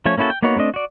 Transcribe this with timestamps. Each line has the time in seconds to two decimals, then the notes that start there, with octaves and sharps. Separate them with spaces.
0.06 F3 A3 C#4 C#5
0.17 A#3 C#4 E4 F#4 A4
0.30 G5
0.42 A#3 B3 D#4 F#4 C#5
0.56 A3 C4 D4 D#5
0.74 F#4 D5